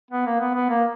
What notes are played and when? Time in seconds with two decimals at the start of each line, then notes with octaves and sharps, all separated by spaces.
0.11 B3
0.26 A#3
0.40 B3
0.54 B3
0.69 A#3